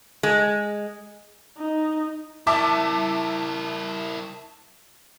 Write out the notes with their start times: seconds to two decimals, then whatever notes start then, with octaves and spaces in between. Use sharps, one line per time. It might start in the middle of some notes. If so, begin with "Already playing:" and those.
0.23 G#3
1.58 D#4
2.47 E4 A#4 E5 A5 D6